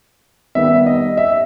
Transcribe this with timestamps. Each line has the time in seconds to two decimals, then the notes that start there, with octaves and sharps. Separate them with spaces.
0.55 D#3 G3 B3 E5
0.86 D#5
1.17 E5